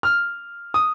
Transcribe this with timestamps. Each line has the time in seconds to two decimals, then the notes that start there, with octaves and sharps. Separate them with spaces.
0.03 F6
0.74 D#6